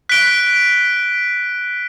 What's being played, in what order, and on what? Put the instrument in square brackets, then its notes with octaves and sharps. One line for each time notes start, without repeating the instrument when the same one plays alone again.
[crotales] F#6 B6 D7 G7